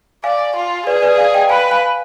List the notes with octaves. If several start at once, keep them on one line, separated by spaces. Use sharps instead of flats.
D5 F5 G#5
F4
G#4 B4 D5
B4 D5
D5 F5
D#5 G5
B4 F5 G#5
F5 G#5